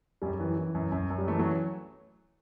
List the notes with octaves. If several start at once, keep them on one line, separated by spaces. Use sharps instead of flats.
F#2 G3
E3
E3
F#2
F#2
F#2
G3
E3 A3
F#3